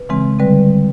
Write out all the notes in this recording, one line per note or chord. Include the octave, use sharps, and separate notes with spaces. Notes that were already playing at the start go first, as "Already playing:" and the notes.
Already playing: B4
C#3 E3 G#3 C4
D3 G3 C4 B4